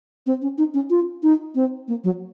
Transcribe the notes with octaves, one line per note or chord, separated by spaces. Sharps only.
C4
C#4
D#4
C#4
F4
D#4
C4
A#3
F#3